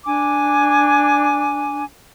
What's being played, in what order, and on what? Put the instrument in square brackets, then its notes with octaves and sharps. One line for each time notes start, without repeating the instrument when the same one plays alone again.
[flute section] D4 G#5 D6